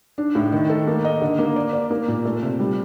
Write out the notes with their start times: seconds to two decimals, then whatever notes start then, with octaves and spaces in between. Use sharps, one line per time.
0.18 D4
0.35 A2
0.52 D#3
0.70 A4
0.87 A#3
1.05 D#5
1.21 D3
1.39 A#3
1.56 D5
1.73 D5
1.91 A#3
2.08 A#2
2.25 A3
2.42 C3
2.59 G3